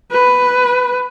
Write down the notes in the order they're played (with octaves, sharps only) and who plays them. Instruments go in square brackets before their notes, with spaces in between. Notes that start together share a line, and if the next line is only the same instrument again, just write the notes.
[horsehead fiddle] B4